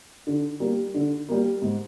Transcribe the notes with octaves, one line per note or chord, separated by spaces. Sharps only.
D3
G3 A#3
D3
G3 A#3
G#2